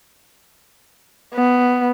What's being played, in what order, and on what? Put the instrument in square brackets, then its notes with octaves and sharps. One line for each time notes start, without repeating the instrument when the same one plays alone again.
[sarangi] B3